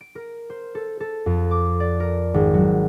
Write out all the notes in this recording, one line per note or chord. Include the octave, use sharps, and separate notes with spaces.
D7
A#4
C5
A4
A4
F2
D6
D5
A#4
G#1
F#3